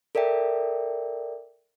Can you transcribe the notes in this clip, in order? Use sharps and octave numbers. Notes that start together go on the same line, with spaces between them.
A4 A#4 D5 E5 G5